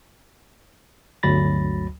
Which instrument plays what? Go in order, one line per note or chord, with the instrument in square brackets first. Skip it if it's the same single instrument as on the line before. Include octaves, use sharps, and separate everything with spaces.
[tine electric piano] G1 D2 F#3 B5 A6 A#6